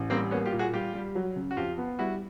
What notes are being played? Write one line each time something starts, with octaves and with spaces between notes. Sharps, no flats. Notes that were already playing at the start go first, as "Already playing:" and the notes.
Already playing: A1
G3 A#3 C4
A#3 B3 C#4
F4 G4
A#2
F#4 G#4
G3 F4 G4
G3
F#3
C#3
F#4
F2 F4 G4
B3
G3 E4 F#4